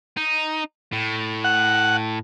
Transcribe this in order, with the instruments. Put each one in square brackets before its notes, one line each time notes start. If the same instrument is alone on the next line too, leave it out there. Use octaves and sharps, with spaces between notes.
[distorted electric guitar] D#4
A2
[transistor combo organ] F#5